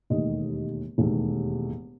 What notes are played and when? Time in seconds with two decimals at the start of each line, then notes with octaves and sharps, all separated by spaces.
0.10 E1 D#2 D#3 A3 D#5
0.98 E1 D#2 D#3 A3